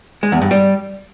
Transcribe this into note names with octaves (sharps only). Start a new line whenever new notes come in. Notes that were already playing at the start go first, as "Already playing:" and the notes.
G#3
E2
G2
G3